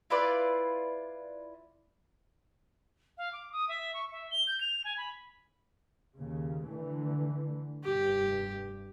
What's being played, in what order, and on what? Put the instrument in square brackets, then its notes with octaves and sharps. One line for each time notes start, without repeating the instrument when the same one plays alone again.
[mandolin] E4 F4 B4 D5
[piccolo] F5
D6
D#6
E5
C#6
E5
G7
G6
F7
G#5
B5
[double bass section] D#2 C#3
D3 E3 A3
[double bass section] F1 G2 [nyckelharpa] G4